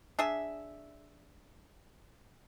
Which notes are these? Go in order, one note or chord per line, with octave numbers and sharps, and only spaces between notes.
D4 G#4 E5